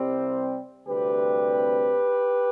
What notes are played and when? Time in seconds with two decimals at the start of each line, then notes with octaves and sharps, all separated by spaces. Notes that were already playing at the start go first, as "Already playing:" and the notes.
Already playing: C2 C3 G3 C4
0.87 D2 C3 G3 C4 G4 B4